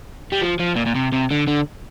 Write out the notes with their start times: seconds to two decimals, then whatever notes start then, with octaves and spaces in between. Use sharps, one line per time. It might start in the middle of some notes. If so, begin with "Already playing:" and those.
0.32 G3
0.41 F3
0.59 F3
0.76 A#2
0.86 A#2
0.95 C3
1.12 C3
1.31 D3
1.47 D3